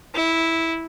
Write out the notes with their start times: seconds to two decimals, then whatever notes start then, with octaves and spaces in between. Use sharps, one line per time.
0.15 E4